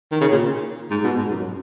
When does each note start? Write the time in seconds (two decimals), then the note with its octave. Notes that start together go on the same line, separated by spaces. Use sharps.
0.12 D#3
0.21 C#3
0.31 A#2
0.91 G#2
1.04 B2
1.18 G#2
1.31 F#2